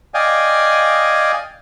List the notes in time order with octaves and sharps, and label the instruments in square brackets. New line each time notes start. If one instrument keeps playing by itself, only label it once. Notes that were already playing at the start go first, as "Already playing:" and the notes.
[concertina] D5 D#5 F5 G5 G#5